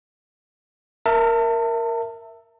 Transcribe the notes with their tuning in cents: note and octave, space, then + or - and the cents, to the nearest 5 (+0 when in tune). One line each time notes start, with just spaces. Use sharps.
A#4 +0 E5 +0 A5 +35